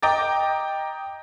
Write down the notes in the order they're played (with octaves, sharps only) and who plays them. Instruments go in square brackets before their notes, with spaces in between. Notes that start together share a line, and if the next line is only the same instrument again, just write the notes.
[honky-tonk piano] D#5 G5 A#5 D6 A6